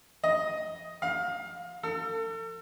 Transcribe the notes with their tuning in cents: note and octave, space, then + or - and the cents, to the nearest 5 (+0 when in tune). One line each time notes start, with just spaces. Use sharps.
D#5 +5
F5 +25
A4 +40